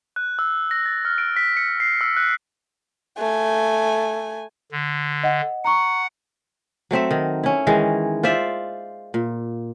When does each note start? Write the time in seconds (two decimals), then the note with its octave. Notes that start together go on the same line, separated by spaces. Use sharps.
0.16 F#6
0.39 E6
0.71 A#6
0.86 A6
1.05 F6
1.18 D7
1.36 B6
1.57 C#7
1.80 C7
2.01 E6
2.16 F#6
3.18 A3 G#5
4.72 D3
5.23 D#5 F#5
5.65 F#5 A#5 C#6
6.91 F#3 A3 C4 E5
7.11 D#3
7.43 C#4 E4
7.67 D#3 E3 G#3
8.23 F4 C5 D5 E5
9.14 A#2